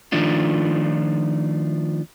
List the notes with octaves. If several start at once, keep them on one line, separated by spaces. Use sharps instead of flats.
D#3 F3 A3 D4 F4